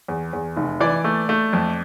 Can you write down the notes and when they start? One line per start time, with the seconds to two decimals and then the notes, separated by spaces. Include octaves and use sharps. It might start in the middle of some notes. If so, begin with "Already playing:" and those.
0.08 E2
0.33 E2
0.57 F1
0.81 E3 D5
1.04 A3
1.29 A3
1.53 F2